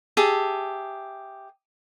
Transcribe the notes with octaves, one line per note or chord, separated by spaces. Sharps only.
G4 G#4 E5 A5